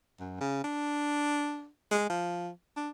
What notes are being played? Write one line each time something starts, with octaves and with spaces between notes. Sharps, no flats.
F#2
C#3
D4
G#3
F3
D4